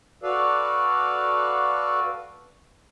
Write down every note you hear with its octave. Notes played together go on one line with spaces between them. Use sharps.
F#4 A4 B4 D5 F5